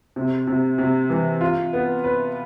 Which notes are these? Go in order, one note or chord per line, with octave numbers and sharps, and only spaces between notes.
C3
C3
C3
E3
F4
B3
B4